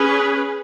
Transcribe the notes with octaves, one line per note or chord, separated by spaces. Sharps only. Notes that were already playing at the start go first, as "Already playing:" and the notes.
Already playing: C#4 G#4 B4